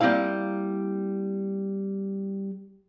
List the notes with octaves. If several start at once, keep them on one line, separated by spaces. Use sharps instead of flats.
G3 A#3 C4 E4 F5